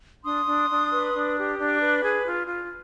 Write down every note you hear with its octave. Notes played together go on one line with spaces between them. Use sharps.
D4 C6 D#6
D4
D4
B4
D4
G4
D4
B4
G#4
F4
F4